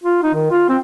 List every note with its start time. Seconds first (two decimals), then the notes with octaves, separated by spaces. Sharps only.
0.04 F4
0.23 D#4
0.34 D#3
0.51 F4
0.69 C4